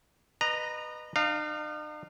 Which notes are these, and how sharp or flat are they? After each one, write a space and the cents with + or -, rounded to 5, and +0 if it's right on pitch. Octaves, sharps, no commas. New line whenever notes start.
B4 +0 D#5 -30 A#5 +0
D#4 -45 F5 +0